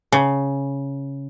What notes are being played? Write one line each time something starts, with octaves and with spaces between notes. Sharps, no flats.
C#3